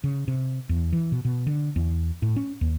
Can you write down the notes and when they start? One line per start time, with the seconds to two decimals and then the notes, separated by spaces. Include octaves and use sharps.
0.04 C#3
0.28 C3
0.69 E2
0.93 E3
1.12 B2
1.25 B2
1.47 D3
1.76 E2
2.22 A2
2.36 C#4
2.61 D#2